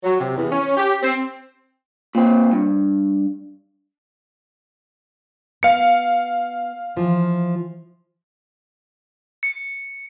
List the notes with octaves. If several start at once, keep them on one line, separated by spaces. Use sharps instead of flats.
F#3
C3
E2
C#4
G4
C4
A#2 C4
G2
B3 F5 C#7
E3 F3
C#7